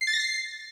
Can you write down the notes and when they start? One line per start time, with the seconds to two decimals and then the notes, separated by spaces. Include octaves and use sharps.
0.01 C7
0.07 A6
0.13 A#6
0.19 C7